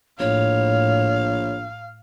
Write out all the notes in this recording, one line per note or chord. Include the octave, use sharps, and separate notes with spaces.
A#1 A2 C#5 F5